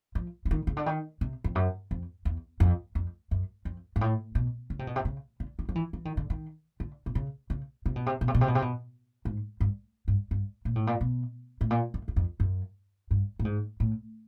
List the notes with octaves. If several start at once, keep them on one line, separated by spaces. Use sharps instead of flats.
F3
E3
D#3
C#3
D3
D#3
C3
F2
F#2
F2
E2
F2
F2
F#2
F2
G#2
A2
B2
C#3
C3
B2
C3
C#3
D3
D#3
F3
E3
E3
D#3
D3
D#3
D3
C3
C#3
C#3
C3
B2
C3
B2
C3
B2
C3
B2
C3
B2
G#2
G2
G2
G2
A#2
A2
A#2
B2
A2
A#2
F#2
E2
F2
F#2
G2
A2
G#2
A2